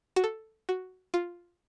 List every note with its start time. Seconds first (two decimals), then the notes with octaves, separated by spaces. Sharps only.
0.16 F#4
0.24 A4
0.69 F#4
1.14 F4